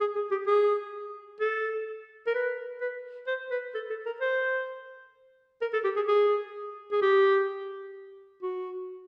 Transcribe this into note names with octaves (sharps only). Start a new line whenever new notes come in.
G#4
G#4
G4
G#4
A4
A#4
B4
B4
C5
B4
A4
A4
A#4
C5
A#4
A4
G4
G#4
G#4
G#4
G4
F#4